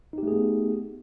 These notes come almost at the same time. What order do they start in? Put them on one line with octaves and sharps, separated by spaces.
D#4 G4 A3 G#4 B3